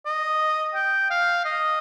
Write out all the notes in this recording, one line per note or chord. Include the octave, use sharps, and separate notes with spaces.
D#5
G5
F5
D#5